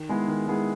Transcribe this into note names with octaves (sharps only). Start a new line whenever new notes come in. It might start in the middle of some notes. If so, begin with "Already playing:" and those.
Already playing: D#3
G#3 B3 E4 G#4
D#3
G#3 B3 E4 G#4